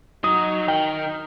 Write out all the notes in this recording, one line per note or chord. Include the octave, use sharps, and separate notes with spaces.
F#3 D#4 D#6
D#3 G5